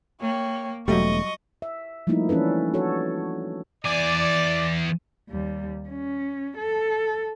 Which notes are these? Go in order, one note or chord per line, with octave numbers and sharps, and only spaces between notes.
A#3 C#5 G5
E1 F#3 G3 A3 D#5 C#6
E5
F3 G3 A3 A#3 D#4 E4
E3 C#4 D4 A4 B4
F#4 A4 C#5
E2 D5 G#5
D#2 G3
C#4
A4